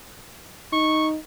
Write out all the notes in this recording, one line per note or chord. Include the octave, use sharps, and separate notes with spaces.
D#4 C#6